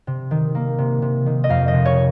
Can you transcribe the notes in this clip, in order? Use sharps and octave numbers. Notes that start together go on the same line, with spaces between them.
C3
D#3
A#3
C3
C3
D#3
D#5
F2 F5
D#5
C3
C#5